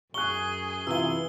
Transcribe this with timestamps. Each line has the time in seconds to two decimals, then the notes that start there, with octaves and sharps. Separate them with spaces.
0.14 F#2 G#4 C#6 F#6 G7
0.87 C3 E3 F4 E6 G7